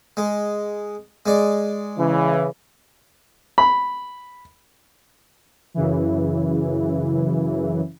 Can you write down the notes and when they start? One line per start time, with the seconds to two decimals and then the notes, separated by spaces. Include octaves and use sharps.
0.17 G#3
1.26 G#3 D5
1.98 C#3 E3
3.58 B5
5.74 F#2 C#3 E3